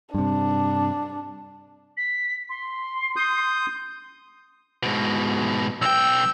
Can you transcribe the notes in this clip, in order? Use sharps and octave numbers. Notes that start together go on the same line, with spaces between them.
G2 C3 D4
B6
C6
D#6 G6
G#2 B2
B1 G5 E6